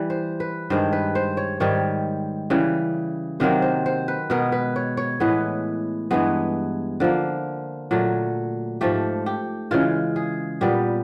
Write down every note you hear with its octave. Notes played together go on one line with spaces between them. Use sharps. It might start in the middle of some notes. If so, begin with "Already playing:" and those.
Already playing: E3 G3
C5
B4
G2 D#3 G#3 C5
B4
C5
C#5
G#2 D#3 G3 C#5
C#3 E3 G3
C3 D#3 F#3 A#3 C5
C5
C5
B4
B2 G#3 B3 A#4
B4
C#5
C#5
A2 E3 G#3 B3 B4
G2 E3 G#3 B3
D3 F3 A#3
A#2 F#3 A3
G#2 F3 A3 G4
G4
C#3 E3 G#3 F4
G#4
A#2 G3 B3 G4